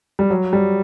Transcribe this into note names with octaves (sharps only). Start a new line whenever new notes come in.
G3
F#3
G3